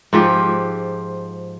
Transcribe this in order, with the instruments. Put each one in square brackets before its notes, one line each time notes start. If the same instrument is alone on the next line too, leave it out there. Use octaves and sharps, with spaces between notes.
[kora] G#2 F3 G4